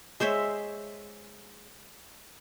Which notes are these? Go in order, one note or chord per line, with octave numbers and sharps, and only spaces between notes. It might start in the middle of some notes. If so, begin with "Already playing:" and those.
G#3 C5 C#5 E5